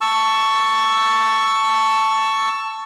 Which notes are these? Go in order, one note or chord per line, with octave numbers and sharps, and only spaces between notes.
A5 C#6 E6